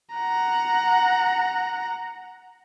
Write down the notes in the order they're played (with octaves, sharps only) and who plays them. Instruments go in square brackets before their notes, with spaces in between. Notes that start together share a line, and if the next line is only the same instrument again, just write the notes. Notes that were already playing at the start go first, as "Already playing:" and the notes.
[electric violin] F#5 A#5